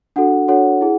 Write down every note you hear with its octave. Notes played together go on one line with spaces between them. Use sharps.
D4 F#4 A4 F#5
D4 F#4 A4 C#5 F#5
E4 G#4